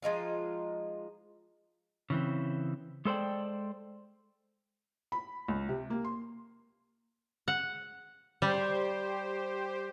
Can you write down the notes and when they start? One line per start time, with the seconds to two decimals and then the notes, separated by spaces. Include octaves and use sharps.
0.02 F3 G#3 D#4 F4
2.10 C#3 E3 C4
3.05 G#3 A4 C5 D5 G5
5.12 B5
5.48 C#2
5.69 C3
5.90 A#3
6.05 C6
7.48 F#5
8.42 G3 G4 C5